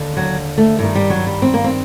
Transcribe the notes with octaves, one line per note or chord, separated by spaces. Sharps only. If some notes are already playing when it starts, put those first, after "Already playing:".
Already playing: D#2 D3
F#3
A3
G2 D#3 A3
G3
F#3
G3
C4
A#3
C4